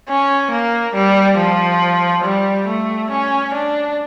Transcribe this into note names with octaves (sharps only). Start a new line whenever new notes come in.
C#4
A#3
G3
F3
G3
A3
C#4
D4